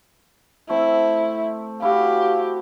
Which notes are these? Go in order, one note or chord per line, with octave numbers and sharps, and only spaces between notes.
A3 C4 E4
E4 F#4 G4 F5